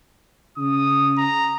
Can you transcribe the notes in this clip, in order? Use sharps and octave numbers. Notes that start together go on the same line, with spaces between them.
C#3 D#6
A#5